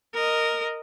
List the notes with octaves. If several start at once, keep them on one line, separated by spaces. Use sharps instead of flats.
A#4 D#5